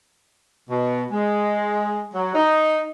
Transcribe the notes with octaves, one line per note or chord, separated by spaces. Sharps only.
B2
G#3
F#3
D#4